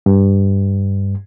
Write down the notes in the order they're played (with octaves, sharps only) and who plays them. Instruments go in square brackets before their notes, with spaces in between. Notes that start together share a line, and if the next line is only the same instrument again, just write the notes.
[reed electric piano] G2